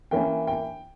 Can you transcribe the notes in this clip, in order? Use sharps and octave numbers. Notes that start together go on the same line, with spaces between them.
E3 A#3 C#4 G5
G5